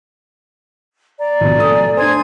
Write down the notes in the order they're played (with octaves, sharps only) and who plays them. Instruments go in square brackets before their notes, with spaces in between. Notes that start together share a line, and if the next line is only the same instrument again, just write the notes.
[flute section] D5 A#5
[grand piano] A#1 B2
A3 G#5 D#6
[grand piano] D4 C5 [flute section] G#5 C6 G#6